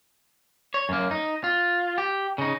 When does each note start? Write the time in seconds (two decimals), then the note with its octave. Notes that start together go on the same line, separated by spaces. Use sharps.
0.74 C#5
0.89 F#2 A#3
1.11 D#4
1.44 F4
1.98 G4
2.38 C#3 D#4